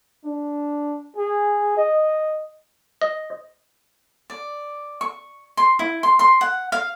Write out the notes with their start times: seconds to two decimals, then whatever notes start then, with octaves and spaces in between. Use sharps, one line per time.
0.24 D4
1.17 G#4
1.77 D#5
3.02 D#5
4.30 D5
5.01 C#6
5.57 C6
5.79 E4
6.03 C6
6.19 C6
6.41 F#5
6.72 F5